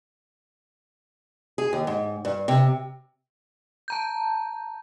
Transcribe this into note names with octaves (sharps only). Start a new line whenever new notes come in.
G#4
D#2
G#2
G2
C3
A5 A#5 G6